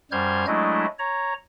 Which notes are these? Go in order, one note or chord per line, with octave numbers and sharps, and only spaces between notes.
F#2 G3 C5 F6 G6 G#6
F#3 G#3 A3 D4 E4 D#5
C#5 A#5